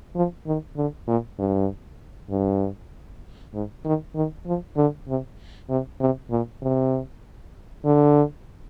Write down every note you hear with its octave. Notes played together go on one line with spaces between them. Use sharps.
F3
D#3
D3
A#2
G2
G2
G#2
D#3
D#3
F3
D3
C3
C3
C3
A#2
C3
D3